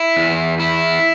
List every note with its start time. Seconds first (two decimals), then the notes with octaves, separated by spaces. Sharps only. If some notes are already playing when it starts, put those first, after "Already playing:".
Already playing: E4
0.17 E2
0.60 E4